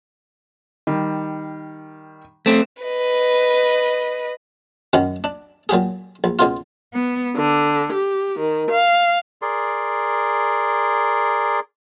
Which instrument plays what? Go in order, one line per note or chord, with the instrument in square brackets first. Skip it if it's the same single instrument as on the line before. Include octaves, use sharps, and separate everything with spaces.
[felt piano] D#3 G3
[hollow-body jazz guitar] A3 C4
[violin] B4 D#5
[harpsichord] F#2 D#3 F#3 C#4
D4
A#2 F#3 G4 G#4
A#1
C#2 B2 F4
[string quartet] B3
D3
G4
D#3
F5
[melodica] G#4 A#4 D5 C6